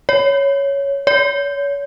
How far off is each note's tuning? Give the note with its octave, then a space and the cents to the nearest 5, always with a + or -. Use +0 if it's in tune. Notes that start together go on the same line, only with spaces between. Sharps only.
C#5 +5
C#5 +35